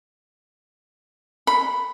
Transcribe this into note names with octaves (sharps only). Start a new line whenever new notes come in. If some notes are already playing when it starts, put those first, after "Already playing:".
B5